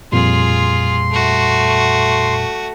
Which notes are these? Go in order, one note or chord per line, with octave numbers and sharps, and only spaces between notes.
F2 A#2 G3 F4 G#4 C6
A3 F#4